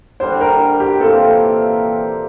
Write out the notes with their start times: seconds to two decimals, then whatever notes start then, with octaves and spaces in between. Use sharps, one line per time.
0.20 D3 G3 D4 C5
0.41 A#4
0.80 G4
1.00 C3 E3 A#3 F4 A4